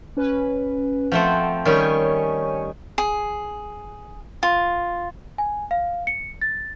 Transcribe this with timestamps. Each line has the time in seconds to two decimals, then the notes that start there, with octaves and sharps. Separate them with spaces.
0.17 C#4 B4
1.12 F3 A3 C4 F#5
1.65 D#3 G3 C#4 C#5 G#5 C#6
2.98 G#4
4.43 F4
5.38 G#5
5.71 F5
6.07 C#7
6.41 A6